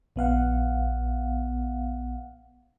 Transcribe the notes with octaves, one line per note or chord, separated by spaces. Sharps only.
A#1 B3 F5 F#5